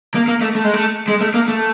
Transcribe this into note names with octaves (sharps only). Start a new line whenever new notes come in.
A#3
A#3
A3
A3
G#3
A3
G#3
A3
A#3
A3